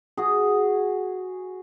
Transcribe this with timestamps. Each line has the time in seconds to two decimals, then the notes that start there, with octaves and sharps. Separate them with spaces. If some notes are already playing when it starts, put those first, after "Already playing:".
0.17 F#4 G#4